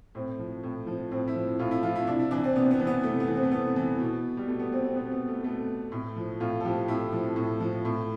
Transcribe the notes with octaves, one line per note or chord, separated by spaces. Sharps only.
A2 C4
F3
A2
F3
A2 C4
E4
F3
A2 F4
E4
F3 F4
E4
C3 D4
E4
E3 D4
C4
C3 B3
C4
B3
E3
B3
C3 A3
B3
E3
C4
A3
C3 B3
E3
B2
G3
B2 A3
B3
C4
C4
B2 B3
B3
A3
B2 A3
A2
F3
A2 F4
A4
F3 G4
A2 E4
F3
A2
F3
A2